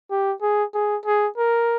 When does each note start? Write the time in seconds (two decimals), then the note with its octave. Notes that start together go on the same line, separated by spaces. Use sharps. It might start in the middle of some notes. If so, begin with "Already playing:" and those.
0.11 G4
0.42 G#4
0.75 G#4
1.06 G#4
1.37 A#4